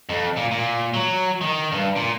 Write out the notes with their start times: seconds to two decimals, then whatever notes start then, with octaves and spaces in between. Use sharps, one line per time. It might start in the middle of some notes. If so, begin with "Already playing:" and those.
0.09 F2
0.37 A#2
0.51 A#2
0.94 F#3
1.41 D#3
1.72 G2
1.96 A#2